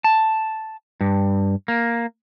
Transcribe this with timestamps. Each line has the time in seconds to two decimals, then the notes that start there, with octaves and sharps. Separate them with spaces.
0.04 A5
1.01 G2
1.68 A#3